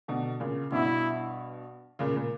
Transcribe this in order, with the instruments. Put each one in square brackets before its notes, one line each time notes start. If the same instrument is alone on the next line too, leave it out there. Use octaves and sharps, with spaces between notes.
[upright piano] B2 D3
A#2 C#3
[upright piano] G2 B2 [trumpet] E4
[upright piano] A#2 C#3
A#2